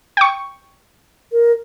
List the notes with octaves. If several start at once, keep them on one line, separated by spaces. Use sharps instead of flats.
G5 C#6
A#4